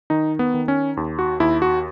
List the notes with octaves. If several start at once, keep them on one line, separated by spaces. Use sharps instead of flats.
D#3 D#4
B3
D#3
C#4
D#2
F#4
D#2 E4
F#4